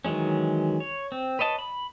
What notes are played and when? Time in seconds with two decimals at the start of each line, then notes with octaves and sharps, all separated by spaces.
0.05 D#3 E3 F#3 G#3 C#4
0.80 C#5
1.12 C4
1.39 B4 C#5 D#5 A5
1.59 B5